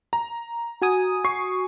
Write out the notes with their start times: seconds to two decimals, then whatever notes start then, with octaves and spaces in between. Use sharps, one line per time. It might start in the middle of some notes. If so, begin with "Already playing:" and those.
0.13 A#5
0.82 F#4 G#5 D#6
1.25 C#6 C7